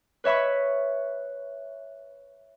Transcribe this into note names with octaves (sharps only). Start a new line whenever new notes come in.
B4 C#5 E5 B5 C#6